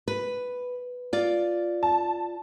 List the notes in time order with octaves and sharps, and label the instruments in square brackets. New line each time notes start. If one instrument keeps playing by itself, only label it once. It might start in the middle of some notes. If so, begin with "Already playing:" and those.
[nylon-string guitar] B4
F4 D5
[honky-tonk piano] A5